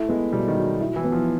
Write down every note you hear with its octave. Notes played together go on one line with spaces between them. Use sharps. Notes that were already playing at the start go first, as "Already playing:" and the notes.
Already playing: A3 E4
G#3 B3
B2 G3
D#3
F#3
E4
E3
B3
F3